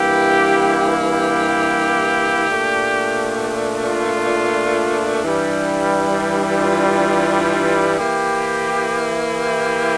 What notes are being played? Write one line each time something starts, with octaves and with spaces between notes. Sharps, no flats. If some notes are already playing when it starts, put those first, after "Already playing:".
Already playing: G2 E3 A#3 E4 G4
G4
A#2 A3 D4
F4
G2 E3 G3 D4
F4
E3 A#3 E4 G4
G4